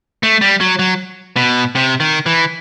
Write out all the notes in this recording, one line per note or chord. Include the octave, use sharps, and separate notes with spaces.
A3
G3
F#3
F#3
B2
C3
D#3
E3